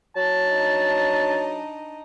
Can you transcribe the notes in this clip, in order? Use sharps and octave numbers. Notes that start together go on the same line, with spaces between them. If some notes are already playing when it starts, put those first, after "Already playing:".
F#3 A5
D4 D#4